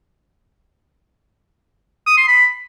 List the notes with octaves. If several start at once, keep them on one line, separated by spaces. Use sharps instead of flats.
D#6
C6
B5